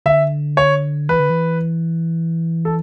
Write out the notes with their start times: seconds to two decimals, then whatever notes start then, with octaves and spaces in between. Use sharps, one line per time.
0.06 D3 E5
0.57 C#5
1.09 E3 B4
1.19 D3
1.30 E3
2.65 A4